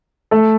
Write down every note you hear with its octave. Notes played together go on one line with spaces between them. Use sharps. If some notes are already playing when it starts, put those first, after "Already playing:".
A3 A4